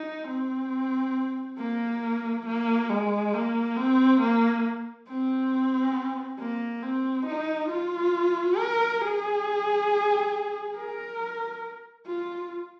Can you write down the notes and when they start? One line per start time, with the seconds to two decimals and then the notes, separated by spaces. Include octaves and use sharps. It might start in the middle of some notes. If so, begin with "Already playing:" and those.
Already playing: D#4
0.28 C4
1.59 A#3
2.46 A#3
2.90 G#3
3.34 A#3
3.76 C4
4.21 A#3
5.08 C4
6.39 A#3
6.82 C4
7.26 D#4
7.70 F4
8.57 A#4
9.01 G#4
10.76 A#4
12.07 F4